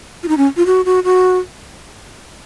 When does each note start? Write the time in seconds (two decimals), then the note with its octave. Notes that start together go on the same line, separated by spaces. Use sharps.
0.23 F4
0.28 D#4
0.37 C#4
0.57 F4
0.66 F#4
0.85 F#4
1.04 F#4